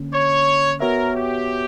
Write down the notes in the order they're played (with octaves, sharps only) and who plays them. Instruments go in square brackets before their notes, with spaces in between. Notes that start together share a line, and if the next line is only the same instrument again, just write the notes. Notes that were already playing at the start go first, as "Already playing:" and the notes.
Already playing: [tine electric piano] D3 A#3 C#4
[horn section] C#5
[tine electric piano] B3 F#4 C#5 E5 [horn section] A#4
[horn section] G4